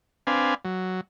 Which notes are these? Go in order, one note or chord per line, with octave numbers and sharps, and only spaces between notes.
C4 D4 B4 F5 G#5
F#3